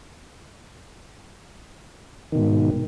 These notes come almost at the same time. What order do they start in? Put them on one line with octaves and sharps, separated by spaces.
D#3 B2 G#2